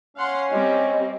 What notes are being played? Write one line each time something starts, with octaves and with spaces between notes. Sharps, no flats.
C#4 F5 F#5 C6
G3 C4 D#5